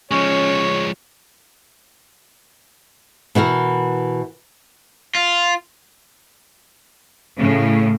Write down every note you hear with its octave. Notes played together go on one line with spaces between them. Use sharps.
F3 G#3 C#4 C#5
B2 E3 E4 A#4
F4
A2 C#3